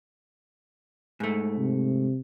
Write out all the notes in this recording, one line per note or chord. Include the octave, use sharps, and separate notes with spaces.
G#2 A3
C3